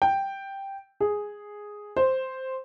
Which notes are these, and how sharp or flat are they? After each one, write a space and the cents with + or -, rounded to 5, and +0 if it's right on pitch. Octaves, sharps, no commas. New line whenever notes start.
G5 +0
G#4 +0
C5 +0